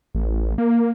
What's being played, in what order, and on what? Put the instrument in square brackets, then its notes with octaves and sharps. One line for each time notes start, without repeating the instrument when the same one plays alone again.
[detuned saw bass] A1
A#3